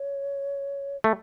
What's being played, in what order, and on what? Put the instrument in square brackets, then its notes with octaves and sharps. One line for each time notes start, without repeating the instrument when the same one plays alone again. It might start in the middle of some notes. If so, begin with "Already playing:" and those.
Already playing: [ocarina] C#5
[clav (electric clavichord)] A3